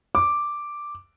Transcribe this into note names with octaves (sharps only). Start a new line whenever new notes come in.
D6